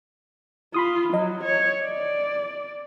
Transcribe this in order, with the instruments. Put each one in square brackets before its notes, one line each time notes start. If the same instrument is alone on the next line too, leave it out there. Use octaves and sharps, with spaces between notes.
[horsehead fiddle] F4 [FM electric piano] B5 C6 D#6
[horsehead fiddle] F#3 [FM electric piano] D#5
[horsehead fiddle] C#5
D5